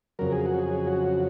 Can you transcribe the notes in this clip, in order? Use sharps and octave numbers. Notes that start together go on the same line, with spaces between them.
F2 C#3 F#3 A#4
G#4
F#4
G#4
F#4